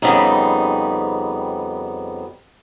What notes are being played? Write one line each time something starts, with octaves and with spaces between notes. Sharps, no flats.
F2 C#3 G3 B3 C4 D#4